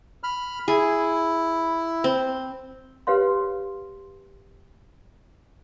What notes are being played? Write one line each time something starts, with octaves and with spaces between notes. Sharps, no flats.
B5 F6
E4 G#4
C4
G4 B4 C#5 F5 C6